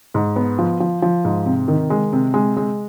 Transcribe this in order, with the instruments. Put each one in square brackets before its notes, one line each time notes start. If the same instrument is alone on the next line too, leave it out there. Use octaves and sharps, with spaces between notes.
[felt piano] G#2
B3
F3
F3
F3
G#2
C3
D#3
G#3
C3
G#3
G#3